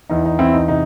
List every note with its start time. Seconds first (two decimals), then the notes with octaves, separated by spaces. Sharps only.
0.10 E2 D#4
0.25 D#4
0.39 E2 C4 E4
0.53 D#4
0.68 C3 D#4